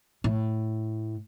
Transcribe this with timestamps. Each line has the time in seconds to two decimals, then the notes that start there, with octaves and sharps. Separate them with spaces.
0.24 A2